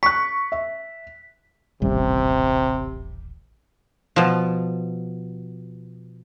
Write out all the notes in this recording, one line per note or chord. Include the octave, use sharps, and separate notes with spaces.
C#6 F#6 B6
E5
D#1 A1 C3 G3
B2 F3